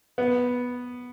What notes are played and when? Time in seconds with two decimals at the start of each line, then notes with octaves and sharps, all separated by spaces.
0.18 B3